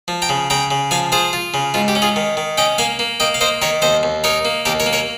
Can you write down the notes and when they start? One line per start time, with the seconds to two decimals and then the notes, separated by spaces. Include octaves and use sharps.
0.08 F3
0.22 G5 A#5
0.29 C#3
0.50 C#3 G5 A#5
0.71 C#3
0.91 F3 F5 G#5
1.12 F4 G#4 C5
1.33 F4
1.54 C#3
1.74 G#2 F4
1.88 G4
1.95 C#4
2.02 F4 G#4
2.16 D#3
2.37 D#3
2.57 C#4 D#5 G5
2.78 A#3 F5 G#5
2.99 A#3
3.20 A#3 D#5 G5
3.34 F5
3.41 A#3 C5 D#5
3.62 D#3 A#4 C#5
3.82 D#2 C5 D#5
4.03 D#2
4.24 D#4 A#4 C#5
4.45 A#3
4.65 D#2 G4 A#4
4.80 A#4 C#5
4.86 A#3
4.93 A#4 C#5